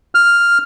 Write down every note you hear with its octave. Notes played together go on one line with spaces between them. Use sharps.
F6